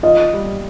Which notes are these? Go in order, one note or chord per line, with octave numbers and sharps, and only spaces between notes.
F4 D#5
G3